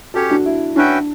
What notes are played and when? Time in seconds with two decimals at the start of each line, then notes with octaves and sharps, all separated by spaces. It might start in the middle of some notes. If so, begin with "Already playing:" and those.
0.14 C#4 F#4 G4 A4 C#5
0.30 D4 F#4
0.45 E4
0.76 C#4 D4 F#4 B4 E5 G5